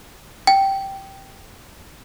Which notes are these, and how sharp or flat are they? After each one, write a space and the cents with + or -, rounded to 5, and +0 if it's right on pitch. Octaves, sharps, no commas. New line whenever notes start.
G5 -10